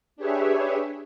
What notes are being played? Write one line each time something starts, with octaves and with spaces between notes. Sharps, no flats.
D4 G4 G#4 B4 C#5 E5